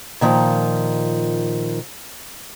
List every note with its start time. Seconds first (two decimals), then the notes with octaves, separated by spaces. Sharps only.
0.21 A#2 D#3 F3